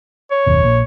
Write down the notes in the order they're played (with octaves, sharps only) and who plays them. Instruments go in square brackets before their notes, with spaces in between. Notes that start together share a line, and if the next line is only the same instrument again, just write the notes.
[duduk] C#5
[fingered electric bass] F#1 D#2 B2
A#1 A#2